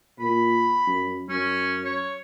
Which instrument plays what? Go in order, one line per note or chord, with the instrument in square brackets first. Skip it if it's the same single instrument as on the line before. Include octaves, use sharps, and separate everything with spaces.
[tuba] A#2 [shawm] B5
[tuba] F#2
[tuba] F#2 [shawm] C#4
[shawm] C#5